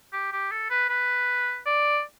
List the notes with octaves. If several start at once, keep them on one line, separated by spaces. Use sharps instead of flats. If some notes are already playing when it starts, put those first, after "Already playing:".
G4
G4
A4
B4
B4
D5